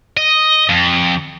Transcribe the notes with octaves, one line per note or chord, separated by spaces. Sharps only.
D#5
F2